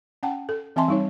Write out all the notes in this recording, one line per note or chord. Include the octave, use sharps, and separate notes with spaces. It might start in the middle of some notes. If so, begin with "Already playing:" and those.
C#4 F#5 G5 A5
A4
E3 C4 E5 G#5 A5 C6
G3 D#4 C#5